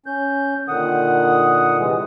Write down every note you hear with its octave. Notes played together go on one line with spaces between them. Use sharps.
C#4 G6
A#2 D3 D#3 F#5 D#6
C3 E3 G#3